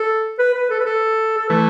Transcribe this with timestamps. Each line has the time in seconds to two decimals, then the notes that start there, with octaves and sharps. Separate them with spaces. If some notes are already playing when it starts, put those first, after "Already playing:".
Already playing: A4
0.39 B4
0.54 B4
0.70 A4
0.80 B4
0.86 A4
1.37 A4
1.49 E3 A3 B4